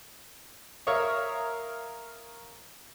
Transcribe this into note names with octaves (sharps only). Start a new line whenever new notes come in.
A#4 C#5 E5 F5 C#6 D#6